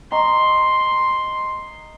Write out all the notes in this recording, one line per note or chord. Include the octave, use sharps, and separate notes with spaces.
D#5 A#5 C6 C#6